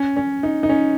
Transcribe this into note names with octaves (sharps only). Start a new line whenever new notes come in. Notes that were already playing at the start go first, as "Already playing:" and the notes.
Already playing: C#4
C#4
D#4
D#4
C#4